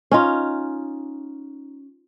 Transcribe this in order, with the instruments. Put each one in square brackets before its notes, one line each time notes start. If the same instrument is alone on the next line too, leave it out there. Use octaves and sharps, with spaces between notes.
[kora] C#4 D#4 F4